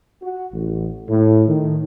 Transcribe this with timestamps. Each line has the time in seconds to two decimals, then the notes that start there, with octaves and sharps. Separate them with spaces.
0.23 F#4
0.53 A1
1.09 A2
1.48 D#3